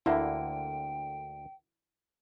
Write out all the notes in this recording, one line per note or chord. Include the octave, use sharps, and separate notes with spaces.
D2 D3 A#3 E4 G5